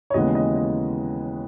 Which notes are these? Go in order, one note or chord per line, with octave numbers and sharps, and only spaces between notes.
C#5
D#2 C#3 E3 G#3 B3 D#5
D#5
D#5